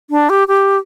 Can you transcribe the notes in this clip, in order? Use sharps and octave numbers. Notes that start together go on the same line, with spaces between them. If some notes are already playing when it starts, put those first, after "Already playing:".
D4
G4
G4